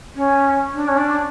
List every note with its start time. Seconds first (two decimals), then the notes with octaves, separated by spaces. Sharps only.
0.15 C#4
0.74 D4
0.88 C#4
0.97 D4